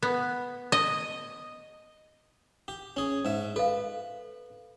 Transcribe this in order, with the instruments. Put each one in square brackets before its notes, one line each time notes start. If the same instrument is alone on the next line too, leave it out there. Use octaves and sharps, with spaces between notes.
[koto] B3
D#5
[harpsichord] G4
C#4 G#4
G#2 E5
[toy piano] A4 F5 [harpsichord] B4